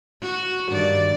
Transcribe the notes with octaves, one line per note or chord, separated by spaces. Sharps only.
F#4
G2 D#3 D5